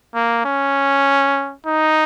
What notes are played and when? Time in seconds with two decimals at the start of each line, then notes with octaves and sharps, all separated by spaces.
0.15 A#3
0.45 C#4
1.67 D#4